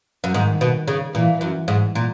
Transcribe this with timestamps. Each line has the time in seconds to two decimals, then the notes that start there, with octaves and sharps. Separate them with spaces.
0.24 F#2
0.34 G#2 D#3
0.61 B2
0.88 C#3
1.14 A#2 E3
1.41 F#2
1.68 G#2
1.95 A#2